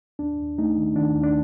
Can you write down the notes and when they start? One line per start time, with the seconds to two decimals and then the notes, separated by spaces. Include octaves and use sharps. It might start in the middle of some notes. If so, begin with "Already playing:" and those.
0.19 D#2 D4
0.39 D#2
0.58 A3 D#4
0.77 D#3
0.96 D#3 D4
1.15 D#2
1.23 D4